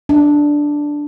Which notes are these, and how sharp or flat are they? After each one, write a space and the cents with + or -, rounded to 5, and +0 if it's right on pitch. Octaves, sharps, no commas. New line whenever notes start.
D4 +0 E5 -45